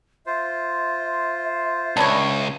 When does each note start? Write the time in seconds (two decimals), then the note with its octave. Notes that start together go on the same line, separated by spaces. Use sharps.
0.26 F4 C5 E5
1.97 C#2 D4 E4 C#5